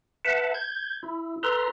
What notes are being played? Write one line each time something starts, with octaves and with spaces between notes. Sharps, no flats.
B4 E5 F#5 A5
G6 G#6
E4
A4 B4 A#5 C6